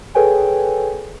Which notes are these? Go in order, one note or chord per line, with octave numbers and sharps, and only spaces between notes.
G#4 A4 B4 C#5 G5 G#5